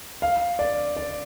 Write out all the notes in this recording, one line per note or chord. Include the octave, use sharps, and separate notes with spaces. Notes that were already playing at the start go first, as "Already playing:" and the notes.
F5
D5
D5